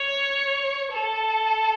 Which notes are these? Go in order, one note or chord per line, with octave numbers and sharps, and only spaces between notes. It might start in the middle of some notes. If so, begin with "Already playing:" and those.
Already playing: C#5
A4